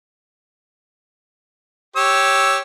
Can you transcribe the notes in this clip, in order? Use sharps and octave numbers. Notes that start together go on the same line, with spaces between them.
G4 C#5 E6